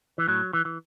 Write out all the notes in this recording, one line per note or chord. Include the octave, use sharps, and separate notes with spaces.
E3
A2 F#3
E3
E3